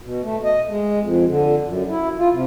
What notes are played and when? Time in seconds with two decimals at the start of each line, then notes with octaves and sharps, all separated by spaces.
0.02 B2
0.23 A3
0.44 D#5
0.68 G#3
1.00 F2
1.28 D3
1.66 F#2
1.90 E4
2.18 F4
2.32 C3